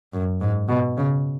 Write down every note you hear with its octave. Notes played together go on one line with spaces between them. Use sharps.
F#2
G#2
B2
C#3